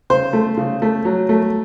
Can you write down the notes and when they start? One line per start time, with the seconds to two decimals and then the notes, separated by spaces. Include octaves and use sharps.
0.10 C#3 C5
0.33 A3
0.57 C#3
0.82 A3
1.05 F#3
1.29 A3